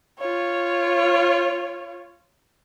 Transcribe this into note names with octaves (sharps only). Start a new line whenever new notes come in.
F4 C#5